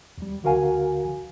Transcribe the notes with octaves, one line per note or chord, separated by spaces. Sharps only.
D#2 G3
D2 D3 F#4 A#4 F5 G#5